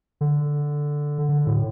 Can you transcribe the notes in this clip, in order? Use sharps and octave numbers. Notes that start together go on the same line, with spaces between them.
D3
D3
A2